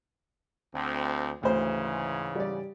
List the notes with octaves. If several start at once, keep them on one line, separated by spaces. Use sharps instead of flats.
D2 C4
D2 G#2 C#3 E3 C5
G3 D5